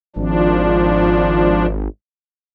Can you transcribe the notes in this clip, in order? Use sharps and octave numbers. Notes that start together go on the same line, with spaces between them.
G#1 F3 D4